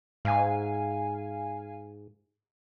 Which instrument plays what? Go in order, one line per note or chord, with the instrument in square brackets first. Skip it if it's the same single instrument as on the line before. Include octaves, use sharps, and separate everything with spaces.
[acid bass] G#2 [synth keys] F5 G#5